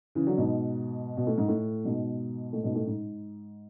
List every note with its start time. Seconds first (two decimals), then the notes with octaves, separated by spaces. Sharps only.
0.15 C#3 E3
0.26 D3 F#3
0.38 G#2 B2
1.17 B2
1.27 A2
1.38 G#2
1.48 A2
1.85 G#2 B2
2.53 A2
2.64 G#2 B2
2.75 A2
2.87 G#2